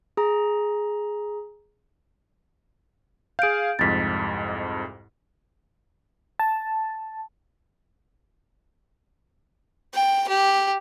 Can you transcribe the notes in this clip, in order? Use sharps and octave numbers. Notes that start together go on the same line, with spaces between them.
G#4 A#5
G#4 F5 G6 D7
C2 F2 G#2 A6 B6
A5
G5
G4